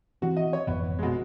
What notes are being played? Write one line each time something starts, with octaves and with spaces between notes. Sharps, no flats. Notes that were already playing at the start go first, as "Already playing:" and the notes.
E3 C4 F#4
D#5
C#5
G#1 F2 E3 B3
B2 G#3